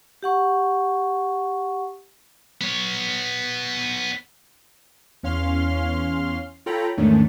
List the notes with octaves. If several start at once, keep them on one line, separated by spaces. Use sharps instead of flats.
G4 F#5 C#6
B3 C#5
E2 C#4 F5 C6 F6
F4 A4 C#5 G5 A#5 B5
E2 G#2 D#3 A3 C#4 D4